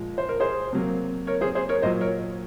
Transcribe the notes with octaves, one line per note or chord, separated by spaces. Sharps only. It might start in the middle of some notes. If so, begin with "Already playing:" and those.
Already playing: A#2 F3 G#3
C5
A#4
G#4 C5
C3 F#3 A#3
A#4 C#5
G#4 C5
G#4 C5
A#4 C#5
A#2 F#3 A#3 C5 D#5
A#4 C#5